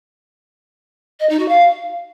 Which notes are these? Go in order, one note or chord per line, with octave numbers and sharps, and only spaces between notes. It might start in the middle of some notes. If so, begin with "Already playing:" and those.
D#5
D#4
F#4
F5